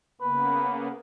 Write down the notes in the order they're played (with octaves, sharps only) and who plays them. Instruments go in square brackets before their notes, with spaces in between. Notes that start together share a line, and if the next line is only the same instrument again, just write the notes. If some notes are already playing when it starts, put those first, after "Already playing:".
[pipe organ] C#3 A#3 B3 [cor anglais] B4